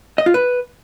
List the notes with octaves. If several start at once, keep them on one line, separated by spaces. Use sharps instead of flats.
D#5
F4
B4